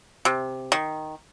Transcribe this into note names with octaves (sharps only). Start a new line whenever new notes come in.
C3
D#3